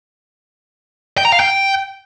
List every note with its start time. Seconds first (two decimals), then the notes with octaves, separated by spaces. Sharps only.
1.18 G5
1.25 A#5
1.32 F5
1.40 G5